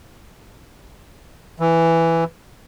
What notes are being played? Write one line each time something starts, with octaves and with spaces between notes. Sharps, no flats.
E3